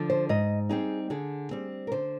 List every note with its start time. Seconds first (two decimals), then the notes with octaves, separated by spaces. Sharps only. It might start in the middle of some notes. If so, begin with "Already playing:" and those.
Already playing: D3 F3
0.10 C5
0.29 G#2 D#5
0.69 G3 C4 D#4 G#4
1.10 D3 G#4
1.51 G3 C4
1.87 A#4
1.92 D3 C5